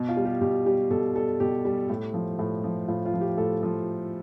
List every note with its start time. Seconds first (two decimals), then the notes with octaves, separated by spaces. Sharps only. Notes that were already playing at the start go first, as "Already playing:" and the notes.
Already playing: B2
0.09 F4
0.17 G3
0.25 G4
0.41 B2 G4
0.66 G3 G4
0.91 B2 A4
1.15 G3 A4
1.40 B2 G4
1.65 G3
1.90 A2
2.14 F3
2.39 A2
2.64 F3
2.88 A2 F4
3.05 F4
3.14 F3
3.21 G4
3.37 A2 A4
3.63 F3